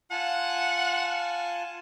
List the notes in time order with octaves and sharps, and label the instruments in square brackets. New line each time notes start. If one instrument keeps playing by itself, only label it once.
[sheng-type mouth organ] F4 G#5 A5 [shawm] F#5